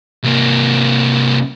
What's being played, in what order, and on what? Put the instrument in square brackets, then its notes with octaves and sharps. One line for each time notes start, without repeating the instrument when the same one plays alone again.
[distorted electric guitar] C2 A#3